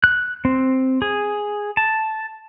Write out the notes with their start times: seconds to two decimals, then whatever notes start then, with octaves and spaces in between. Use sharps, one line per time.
0.04 F#6
0.45 C4
1.02 G#4
1.77 A5